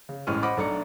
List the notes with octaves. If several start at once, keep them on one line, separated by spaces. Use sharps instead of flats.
C#3
A1 E3 G#3 C#4 F6 D#7
C5 D#5 F#5 B5 D6
B1 A3 D4 A#5 C#7